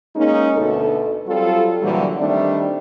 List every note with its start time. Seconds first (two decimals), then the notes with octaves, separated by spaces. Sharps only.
0.15 G#3 A#3 C#4 D#4
0.57 D2 B2 A3 A4
1.26 F#3 G3 C4 F4 A4
1.81 A#2 D3 E3 F#3 G3
2.16 D#3 G3 A3 C4 D4